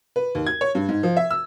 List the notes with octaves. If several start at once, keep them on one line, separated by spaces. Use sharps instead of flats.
B4
D#2
G#6
C#5
G2
G#2
F3
E5
E6